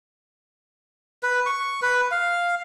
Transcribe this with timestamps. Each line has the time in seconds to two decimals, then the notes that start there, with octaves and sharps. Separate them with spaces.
1.23 B4
1.46 C#6
1.82 B4
2.11 F5